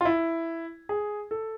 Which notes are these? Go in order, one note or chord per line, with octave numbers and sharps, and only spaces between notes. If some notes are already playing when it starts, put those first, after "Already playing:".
F4
E4
G#4
A4